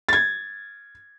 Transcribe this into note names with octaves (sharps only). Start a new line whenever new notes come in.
G#6 A6